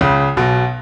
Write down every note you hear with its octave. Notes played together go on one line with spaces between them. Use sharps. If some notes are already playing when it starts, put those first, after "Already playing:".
C#2 C#3
B1 B2